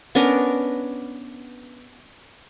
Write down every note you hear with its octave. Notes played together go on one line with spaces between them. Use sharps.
B3 C#4 D4 A#4